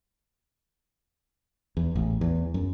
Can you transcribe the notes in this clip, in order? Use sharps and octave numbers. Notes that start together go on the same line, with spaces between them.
E2
A1
E2
F#2